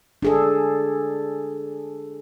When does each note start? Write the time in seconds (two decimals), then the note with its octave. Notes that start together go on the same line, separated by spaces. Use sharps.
0.22 D4 G#4 A4